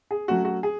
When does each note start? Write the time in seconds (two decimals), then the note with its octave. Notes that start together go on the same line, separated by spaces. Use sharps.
0.11 G#4
0.28 F#3 A3 C#4 F#4
0.45 F#4
0.63 G#4